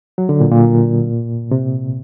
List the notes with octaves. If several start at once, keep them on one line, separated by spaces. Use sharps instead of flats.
F#3
D3
A#2
A#2
C3